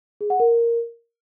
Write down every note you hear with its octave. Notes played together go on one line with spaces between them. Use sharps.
G#4
F#5
A#4